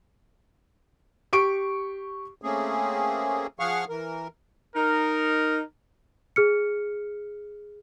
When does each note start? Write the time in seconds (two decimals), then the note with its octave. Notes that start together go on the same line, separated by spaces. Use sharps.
1.33 G4 C#6 D7
2.42 A3 A#3 C4 C#4 G#4
3.60 F3 G#4 F5 F#5 C#6 F6
3.89 E3 A#4
4.76 D#4 A#4
6.36 G#4 F6 C#7